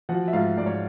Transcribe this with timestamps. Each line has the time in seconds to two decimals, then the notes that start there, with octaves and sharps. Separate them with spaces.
0.09 F3 F#4 F#5
0.28 E5
0.33 G#2 F4 F5
0.58 G#2 D5
0.66 C#5